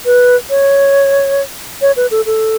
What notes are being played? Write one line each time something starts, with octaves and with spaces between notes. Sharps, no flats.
B4
C#5
C#5
B4
A4
A4